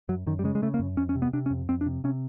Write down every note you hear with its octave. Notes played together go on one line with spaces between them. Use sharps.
F#2 F#3
F#2 D#3
G3
C#3 G#3
G#3
C#3 A3
A#3
F#2
F2 C#4
C#4
C3
B3
C3 D4
C#4
F2
F2 C4
D4
C3
C3 C#4